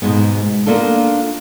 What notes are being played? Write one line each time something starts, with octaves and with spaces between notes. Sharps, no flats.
G#2 B2 G#3 B3
A#3 B3 D4 F4 A4